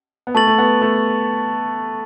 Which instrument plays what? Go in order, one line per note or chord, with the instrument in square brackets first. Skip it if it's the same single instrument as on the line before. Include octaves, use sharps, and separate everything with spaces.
[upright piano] B3
[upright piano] A3 [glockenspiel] A5 C#6 A6 F#7
[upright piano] A3
B3
A3